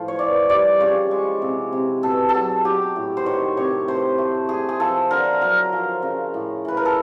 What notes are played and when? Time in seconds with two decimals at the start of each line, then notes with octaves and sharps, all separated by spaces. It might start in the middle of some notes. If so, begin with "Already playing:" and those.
Already playing: A2 F3
0.08 C#5
0.19 E3 D5
0.49 G3 D5
0.80 C#3 C#5
1.11 G#3
1.42 C3
1.72 C3
2.03 B2 A4
2.29 A4
2.34 F#3 G#4
2.65 F#3 G4
2.96 A2
3.17 C5
3.26 D#3 C#5
3.57 C3 C#5
3.88 A3 C5
4.18 A3
4.49 A3 G#4
4.69 G#4
4.80 F3 A4
5.11 D3 A#4
5.41 F#3 A#4
5.73 F3
6.03 C#3
6.34 A2
6.65 E3 B4
6.77 A#4
6.86 A4